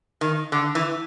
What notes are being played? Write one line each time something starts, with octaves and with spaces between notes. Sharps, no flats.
D#3
D3
E3